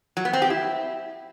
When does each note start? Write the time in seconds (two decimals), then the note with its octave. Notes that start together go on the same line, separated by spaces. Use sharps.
0.17 F#3
0.25 B3
0.33 C4
0.42 G4
0.50 E4